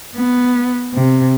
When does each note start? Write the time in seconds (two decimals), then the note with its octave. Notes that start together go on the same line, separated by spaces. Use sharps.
0.16 B3
0.94 C3